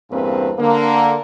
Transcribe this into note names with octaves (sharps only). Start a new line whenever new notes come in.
E2 G2 A#3 C4 B4
D3 A#3